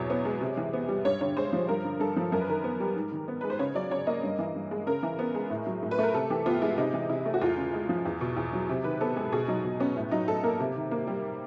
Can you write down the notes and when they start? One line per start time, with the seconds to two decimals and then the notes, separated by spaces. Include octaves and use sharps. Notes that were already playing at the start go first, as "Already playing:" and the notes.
Already playing: E2 B2 F#3 C#5
0.10 B3
0.25 G#3
0.41 C3
0.57 E3
0.73 B3
0.89 G3
1.05 G2 C#5
1.21 D3 C#5
1.37 G#3 C5
1.53 F3
1.68 G2 A#4
1.84 D3
2.00 G2 A4
2.17 F3
2.32 F#2 A#4
2.41 B4
2.48 D#3 A#4
2.64 B3
2.80 G3
2.96 G#2
3.12 D#3
3.28 B3
3.41 G#3 B4
3.50 C5
3.59 C#3 C#5
3.75 F#3 D5
3.91 C#3 C#5
4.07 A#3 D#5
4.23 G2
4.39 E3
4.55 G2
4.71 G#3
4.86 C#3 A#4
5.03 E3
5.19 B3
5.34 G#3
5.50 A2
5.67 F#3
5.83 A2
5.91 B4
5.99 A3 A#4
6.14 C3 A4
6.30 E3 G4
6.46 B3 F4
6.62 G#3 E4
6.78 C3 D#4
6.94 E3
7.09 C3 E4
7.26 A3
7.34 F#4
7.41 E2 F4
7.57 C#3
7.74 G#3
7.89 F3
8.05 E2
8.21 B2
8.37 E2
8.53 F#3
8.69 C3
8.84 D#3 B4
9.01 B3 A4
9.16 G#3 G#4
9.32 B2 G#4
9.48 F#3 D#4
9.64 B2
9.80 B3 C#4
9.96 A2
10.11 F#3 D#4
10.28 A2 A4
10.43 A#3 A#4
10.59 C3
10.76 D#3
10.91 A#3
11.07 G3